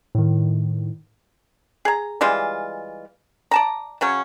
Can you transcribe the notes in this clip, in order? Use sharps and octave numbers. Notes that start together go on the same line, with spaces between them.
A2 D#3
G#4 A#5
E3 G3 G#3 F4
D5 A5 A#5
C#3 F#3 C#4